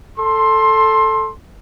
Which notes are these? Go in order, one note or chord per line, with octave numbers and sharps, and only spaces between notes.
A4 C6